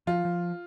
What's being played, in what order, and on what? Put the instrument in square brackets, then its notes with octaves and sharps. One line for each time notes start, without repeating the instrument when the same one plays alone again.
[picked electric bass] F3 [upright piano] F4
[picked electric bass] F3